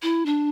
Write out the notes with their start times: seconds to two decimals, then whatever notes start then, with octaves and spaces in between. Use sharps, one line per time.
0.03 E4
0.26 D4